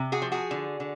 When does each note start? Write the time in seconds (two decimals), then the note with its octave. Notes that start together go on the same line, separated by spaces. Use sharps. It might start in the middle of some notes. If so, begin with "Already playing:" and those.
Already playing: C3
0.12 F#4 G#4
0.22 F3
0.32 F#4 G#4
0.51 D3
0.80 D3